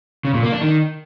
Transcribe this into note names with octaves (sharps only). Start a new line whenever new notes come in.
C#3
A#2
A#3
D4
D#3